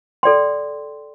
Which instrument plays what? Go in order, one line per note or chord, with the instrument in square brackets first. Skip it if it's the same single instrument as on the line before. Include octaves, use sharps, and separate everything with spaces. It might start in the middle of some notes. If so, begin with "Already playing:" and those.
[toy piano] A4 D5 G5 C6